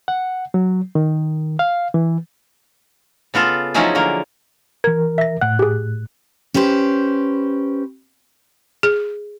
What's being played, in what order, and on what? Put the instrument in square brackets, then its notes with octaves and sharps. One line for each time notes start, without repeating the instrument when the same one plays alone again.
[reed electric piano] F#5
F#3
D#3
F5
E3
[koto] C#3 B3 F4 A4
F3 F#3 C#4 D#4 E4 G#4
D3 A#3
[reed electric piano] E3 A#4 [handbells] G#6
[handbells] E5 A#6
[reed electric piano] A2 F#6 [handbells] F#5
[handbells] G4 G#4
[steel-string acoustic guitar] C#4 G4 B4 C5
[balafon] G#4